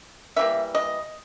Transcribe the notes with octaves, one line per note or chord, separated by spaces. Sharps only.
E3 G3 A#3 E5
D#5